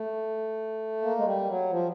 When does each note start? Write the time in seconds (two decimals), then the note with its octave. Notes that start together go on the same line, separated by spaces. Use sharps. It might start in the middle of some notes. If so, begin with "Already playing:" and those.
Already playing: A3
1.02 A#3
1.17 G#3
1.24 G3
1.47 F#3
1.70 F3